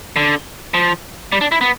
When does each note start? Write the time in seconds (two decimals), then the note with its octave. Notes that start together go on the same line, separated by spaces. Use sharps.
0.16 D3
0.74 F3
1.32 G3
1.41 D4
1.52 E4
1.61 B3